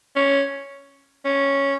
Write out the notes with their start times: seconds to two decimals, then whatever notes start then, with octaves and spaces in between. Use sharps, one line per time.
0.16 C#4
1.25 C#4